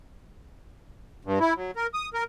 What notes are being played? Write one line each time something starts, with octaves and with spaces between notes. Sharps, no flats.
G2
E4
F#3
A#4
D#6
A#4